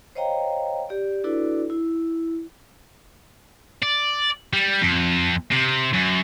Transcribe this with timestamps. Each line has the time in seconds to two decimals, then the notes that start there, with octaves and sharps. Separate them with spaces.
0.15 C5 C#5 D#5 F5 G5 A#5
0.89 G4 D5
1.24 D4 E4 F#4 A4 B4 D5
1.70 E4
3.82 D5
4.53 G3
4.81 F2
5.52 C3
5.93 F#2